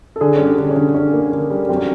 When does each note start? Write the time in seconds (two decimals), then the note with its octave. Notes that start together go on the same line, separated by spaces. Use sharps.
0.16 A4
0.21 D3 G#4
0.36 G3 C#4
0.45 D4
0.58 D3
0.70 C#4
0.76 D3
0.94 D3 C#4
1.14 A#3
1.32 D3
1.50 G3
1.69 F#3 C4
1.76 C#4